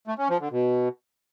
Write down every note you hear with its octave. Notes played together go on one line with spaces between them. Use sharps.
A3
C#4
F3
D3
B2